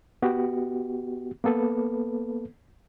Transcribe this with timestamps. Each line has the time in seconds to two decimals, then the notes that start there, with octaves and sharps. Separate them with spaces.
0.22 B3 F#4 G4
1.44 A#3 B3 A4 B4